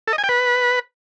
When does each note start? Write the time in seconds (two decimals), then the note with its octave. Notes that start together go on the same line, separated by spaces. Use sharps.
0.08 A4
0.13 D#5
0.18 G#5
0.24 G5
0.29 B4